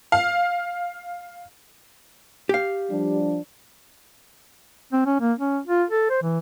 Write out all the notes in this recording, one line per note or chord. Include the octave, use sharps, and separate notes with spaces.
F5
G4 F5
F3 G3 D4
C4
C#4
A#3
C#4
F4
A4
C5
E3